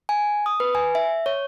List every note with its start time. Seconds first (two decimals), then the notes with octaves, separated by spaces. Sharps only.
0.09 G#5
0.46 D#6
0.60 B4
0.75 G#5
0.95 E5
1.26 C#5